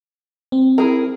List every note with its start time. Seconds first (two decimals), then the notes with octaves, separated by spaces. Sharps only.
0.52 C4
0.78 E4 G#4 A#4